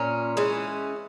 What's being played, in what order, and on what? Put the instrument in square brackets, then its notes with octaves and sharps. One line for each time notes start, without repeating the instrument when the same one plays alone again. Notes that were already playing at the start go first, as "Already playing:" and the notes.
Already playing: [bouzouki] A#2 A#3 C#4
E3 G#3 C#4